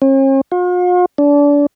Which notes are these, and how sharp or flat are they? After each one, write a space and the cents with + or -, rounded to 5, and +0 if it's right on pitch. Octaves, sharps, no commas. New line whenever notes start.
C#4 -45
F4 +45
D4 -30